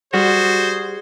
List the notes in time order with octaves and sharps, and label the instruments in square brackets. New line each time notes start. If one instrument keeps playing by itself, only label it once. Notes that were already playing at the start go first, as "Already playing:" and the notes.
[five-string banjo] G3 [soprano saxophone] F#4 [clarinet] G#4 [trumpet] C5